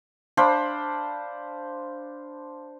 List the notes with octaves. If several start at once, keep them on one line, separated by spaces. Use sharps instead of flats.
D4 C5 F5 B5